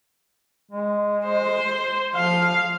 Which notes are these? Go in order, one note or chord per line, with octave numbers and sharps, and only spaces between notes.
G#3
C5
F3 F5